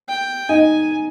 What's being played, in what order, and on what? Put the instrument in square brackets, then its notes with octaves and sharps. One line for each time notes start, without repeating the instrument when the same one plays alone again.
[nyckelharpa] G5
[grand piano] D#4 [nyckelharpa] G#5